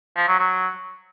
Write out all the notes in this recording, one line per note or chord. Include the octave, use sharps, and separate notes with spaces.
F3
F#3
F#3